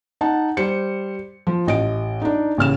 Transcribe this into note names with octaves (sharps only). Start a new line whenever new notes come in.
D#4 F#5 A5
G3 C5 C#7
F3
A1 D#5 D7
D4 D#4
A1 C#3 F6 E7